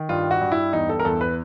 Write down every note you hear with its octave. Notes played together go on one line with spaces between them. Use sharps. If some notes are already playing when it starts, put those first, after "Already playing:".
Already playing: D#3
G2 F4
F#4
G2
E4
E2 D#4
A4
A#4
E2 A4
B4